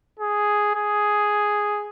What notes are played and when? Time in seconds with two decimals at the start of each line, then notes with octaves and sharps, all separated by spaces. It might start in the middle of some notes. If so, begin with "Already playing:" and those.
0.20 G#4
0.75 G#4